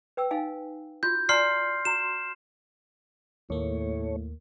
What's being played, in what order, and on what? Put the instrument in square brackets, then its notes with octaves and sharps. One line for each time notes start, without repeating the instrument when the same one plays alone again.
[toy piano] B4 G5 E6
D#4 F5 G#5
[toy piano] F4 F#4 [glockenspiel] G6
[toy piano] D5 G#5 A#5 [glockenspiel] C6 F6 C7
[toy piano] F#4 A#5 C6 [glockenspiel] E7
[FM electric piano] D#2 A#3 [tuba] A2 [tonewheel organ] A3 C#5